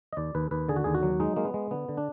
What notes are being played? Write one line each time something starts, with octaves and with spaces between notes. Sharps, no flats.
D#5
D#2 D5
D#2 B4
D#2 B4
D3 G#4
F#4
D#2 G#4
F#4
F#3
G#3 D#4
G#3 A#3
B3
G#3
D3 B3
D3
D4